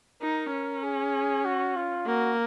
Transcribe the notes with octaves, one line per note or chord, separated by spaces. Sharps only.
D#4 A#4
C#4
G#4
F#4
F4
A#3 F#4